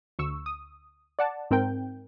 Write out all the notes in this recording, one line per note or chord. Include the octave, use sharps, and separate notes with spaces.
D2 C#6 E6
D#6
D5 F#5 A5
G#2 C4 A#4 G5 G6